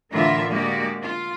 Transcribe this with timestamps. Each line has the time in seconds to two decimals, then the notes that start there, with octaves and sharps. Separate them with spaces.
0.12 A2 D3 E3 F4 A#4 E5
0.51 G#3 A#3 F#4 G4 D5
1.02 F4